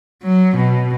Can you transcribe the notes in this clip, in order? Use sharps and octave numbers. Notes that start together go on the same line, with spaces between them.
F#3
B2